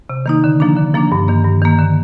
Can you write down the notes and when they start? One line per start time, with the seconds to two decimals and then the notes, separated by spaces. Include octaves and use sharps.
0.10 C3
0.26 D#3 A#3 D#4
0.44 D3
0.60 F3 A#3 D4
0.77 D3
0.94 F3 A#3 D4
1.12 G2
1.28 D#3 A#3
1.45 G2
1.62 D#3 A#3
1.79 D3